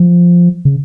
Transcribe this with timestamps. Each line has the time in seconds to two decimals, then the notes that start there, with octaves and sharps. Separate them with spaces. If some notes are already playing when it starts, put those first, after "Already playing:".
Already playing: F3
0.65 C#3